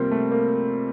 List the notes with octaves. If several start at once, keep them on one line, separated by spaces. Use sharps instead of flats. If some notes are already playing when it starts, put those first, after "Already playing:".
Already playing: C3 F3 G3 A#3 C4
A3
A#3